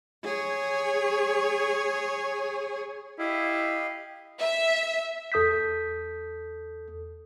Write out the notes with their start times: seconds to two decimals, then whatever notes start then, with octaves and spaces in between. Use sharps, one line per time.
0.24 G#4 C#5
3.19 E4 G4 D#5 F5
4.39 E5
5.32 E2 A4 D#6 G6 B6